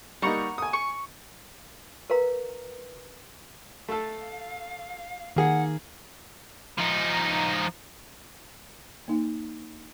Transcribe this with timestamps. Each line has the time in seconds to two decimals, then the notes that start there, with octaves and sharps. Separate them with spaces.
0.22 G3 A#3 D#4 F#5 A#5 C#6
0.58 G#5 D#6
0.73 C#6
2.10 A#4 B4 F5 A#5
3.89 A3 A4 F5
5.36 D#3 A#3 G#4 F#5
6.78 F3 D#4
9.08 A#3 D#4